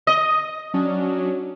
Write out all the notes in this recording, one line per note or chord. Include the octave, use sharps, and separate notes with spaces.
D#5
F#3 C#4 D4